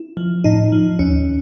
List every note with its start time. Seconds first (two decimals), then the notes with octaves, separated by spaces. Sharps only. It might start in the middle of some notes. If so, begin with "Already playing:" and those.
Already playing: E4
0.17 F3
0.44 A2 D#4
0.72 F3
0.99 D#2 C#4